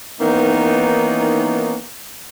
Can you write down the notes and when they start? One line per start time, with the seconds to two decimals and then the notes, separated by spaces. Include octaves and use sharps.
0.20 D#3 E3 A#3 B3 C#4 D#4